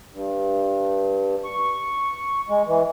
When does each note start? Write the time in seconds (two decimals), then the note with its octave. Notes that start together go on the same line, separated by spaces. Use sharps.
0.14 G2
1.44 C#6
2.49 G#3
2.67 E3